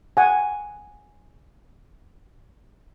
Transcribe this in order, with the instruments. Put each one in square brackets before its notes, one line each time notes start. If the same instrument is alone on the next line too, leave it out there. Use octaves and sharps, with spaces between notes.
[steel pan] F#5 G#5